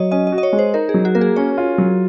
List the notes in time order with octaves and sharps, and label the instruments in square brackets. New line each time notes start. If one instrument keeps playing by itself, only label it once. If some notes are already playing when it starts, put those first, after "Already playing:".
Already playing: [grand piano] F#3 [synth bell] C#5 D#5
[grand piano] C#4 [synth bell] D#5
[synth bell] D#5
[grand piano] F#4
[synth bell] D#5
C#5
[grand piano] G#3
[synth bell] C5
[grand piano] D#4 [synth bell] A#4
[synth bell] G#4
[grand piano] F#3
[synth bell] F#4
[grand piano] A#3 [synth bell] A#4
[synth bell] G#4
[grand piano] C#4 [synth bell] C#5
[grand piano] F4
F#3